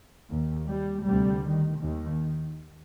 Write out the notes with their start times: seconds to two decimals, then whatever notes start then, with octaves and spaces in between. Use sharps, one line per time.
0.30 D#2
0.68 G3
1.05 D2 C3 G3
1.43 D#3
1.80 D#2 D#3